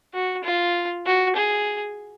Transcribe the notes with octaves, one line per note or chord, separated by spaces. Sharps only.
F#4
F4
F#4
G#4